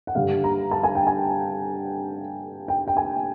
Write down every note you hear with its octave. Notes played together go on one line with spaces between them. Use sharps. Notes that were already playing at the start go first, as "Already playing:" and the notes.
F#5
G2 D3 G3 F5
A#5
A5
G#5
G5
G#5
G5
G5
G#5